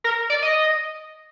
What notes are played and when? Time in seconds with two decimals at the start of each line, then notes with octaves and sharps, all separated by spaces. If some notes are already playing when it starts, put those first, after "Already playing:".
0.04 A#4
0.30 D5
0.42 D#5